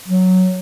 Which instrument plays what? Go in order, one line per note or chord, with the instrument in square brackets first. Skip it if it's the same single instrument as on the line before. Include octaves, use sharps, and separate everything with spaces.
[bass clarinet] F#3